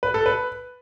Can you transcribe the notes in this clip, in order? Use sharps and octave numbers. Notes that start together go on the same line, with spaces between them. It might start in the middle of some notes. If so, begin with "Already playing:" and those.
B4
A4
B4